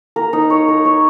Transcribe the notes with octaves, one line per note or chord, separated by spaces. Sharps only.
A#4
D#4
C#5
A#4
C#5